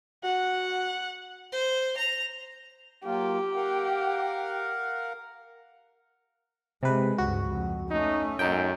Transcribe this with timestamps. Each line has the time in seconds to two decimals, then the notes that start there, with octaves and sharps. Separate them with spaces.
0.23 F#4 F#5
1.52 C5
1.97 A#5
3.05 F#3 A#3 F4 G4
3.56 A#4 F5 F#5
6.83 C3 G#3 B4
7.18 C#2 G2 F#4
7.50 F2
7.91 A3 C#4 D#4
8.39 F#2 D#4 G5